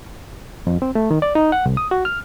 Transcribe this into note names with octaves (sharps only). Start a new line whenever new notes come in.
F2
C4
A3
D#3
D5
D#4
F#5
C2
D#6
F#4
F6